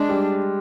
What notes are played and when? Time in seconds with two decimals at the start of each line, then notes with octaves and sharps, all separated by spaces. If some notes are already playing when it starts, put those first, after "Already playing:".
Already playing: G#3 D4
0.09 G3